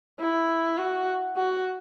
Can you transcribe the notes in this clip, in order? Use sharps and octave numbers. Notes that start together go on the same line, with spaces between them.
E4
F#4
F#4